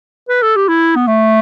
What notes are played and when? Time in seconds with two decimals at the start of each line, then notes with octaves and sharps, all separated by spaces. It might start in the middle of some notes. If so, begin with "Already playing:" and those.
0.29 B4
0.42 A4
0.56 G4
0.68 E4
0.96 B3
1.07 A3